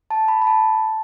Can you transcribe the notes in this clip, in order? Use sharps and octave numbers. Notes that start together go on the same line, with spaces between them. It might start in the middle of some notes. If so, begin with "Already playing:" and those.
A5
B5
B5
A5